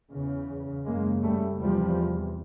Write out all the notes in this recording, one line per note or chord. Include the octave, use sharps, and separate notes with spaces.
E2 C#3
F#2 C#3 G#3 A#3
G3 A3
E2 C3 F3 G3